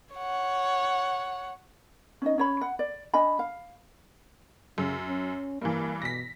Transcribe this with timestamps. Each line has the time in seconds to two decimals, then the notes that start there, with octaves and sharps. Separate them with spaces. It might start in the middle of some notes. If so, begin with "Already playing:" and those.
0.15 C#5 F#5
2.22 C#4 D#4 D#5
2.38 C#4 C#5 B5
2.61 F#5
2.79 D5
3.14 D4 D#5 G#5 B5
3.39 F5
4.78 F#2 C#3
5.07 C#4
5.62 G2 E3 A#3
6.02 B2 A#6 B6